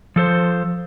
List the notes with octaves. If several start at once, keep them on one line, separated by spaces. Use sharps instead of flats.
F3 A4 C5